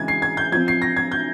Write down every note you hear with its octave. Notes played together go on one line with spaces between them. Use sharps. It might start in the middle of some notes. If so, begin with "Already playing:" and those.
Already playing: C#3 E3 G#3 C4 G#6
C7
G#6
G6
F3 C4 G#6
C7
A#6
G#6
G6